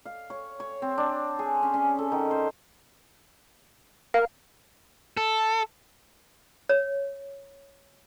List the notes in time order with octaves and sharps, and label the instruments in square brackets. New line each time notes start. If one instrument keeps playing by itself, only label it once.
[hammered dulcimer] F5
C#5
C#5
C4
D4
G#4
C#4
C#4
A4
D#3
C5
[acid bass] A#4 [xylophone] F5
[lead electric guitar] A4
[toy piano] C#5